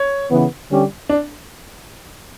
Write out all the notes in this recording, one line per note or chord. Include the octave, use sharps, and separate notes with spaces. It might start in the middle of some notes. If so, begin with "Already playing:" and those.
Already playing: C#5
C#3 E3 B3
D3 G3 C#4 G4
D4